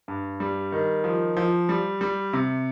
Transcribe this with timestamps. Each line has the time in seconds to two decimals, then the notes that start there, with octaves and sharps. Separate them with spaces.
0.08 G2
0.40 G3
0.72 D#3
1.04 F3
1.37 F3
1.69 G3
2.01 G3
2.33 C3